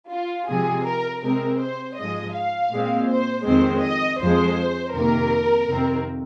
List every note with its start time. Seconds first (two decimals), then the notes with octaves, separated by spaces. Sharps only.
0.10 F4
0.48 C3 F3 G#3 G#4
0.85 A#4
1.22 C3 G#3 C4 A#4
1.59 C5
1.96 G#2 F3 G#3 D#5
2.34 F5
2.71 A#2 G#3 C4
3.08 C5
3.45 F2 D#3 G#3 C4 C5
3.82 D#5
4.19 F2 F3 G#3 C5
4.94 F2 C3 D#3 A#3 A#4
5.68 F2 C3 D#3 C4